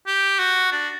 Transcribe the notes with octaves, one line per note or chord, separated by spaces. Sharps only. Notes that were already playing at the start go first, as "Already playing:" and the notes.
G4
F#4
D4